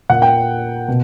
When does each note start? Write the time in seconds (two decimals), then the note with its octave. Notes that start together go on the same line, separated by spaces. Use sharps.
0.10 A#2 F#5
0.22 G5
0.88 B2